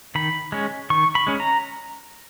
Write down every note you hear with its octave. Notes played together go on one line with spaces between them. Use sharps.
D#3 B5
G#3 C#4
D#3 C#6
B5
G#3 C#4
A#5